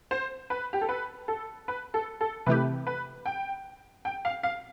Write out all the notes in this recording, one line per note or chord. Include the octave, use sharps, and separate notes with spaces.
C5
B4
G4
A4
B4
A4
B4
A4
A4
C3 E3 A3 E4 G4 B4
B4
G5
G5
F5
F5